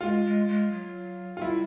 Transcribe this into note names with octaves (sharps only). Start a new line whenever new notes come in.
G#3 F4
G#3
G#3
F#3
F4
G3 E4